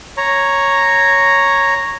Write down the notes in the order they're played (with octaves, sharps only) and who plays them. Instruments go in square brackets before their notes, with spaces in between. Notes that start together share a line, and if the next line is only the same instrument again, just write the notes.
[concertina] C#5 A#5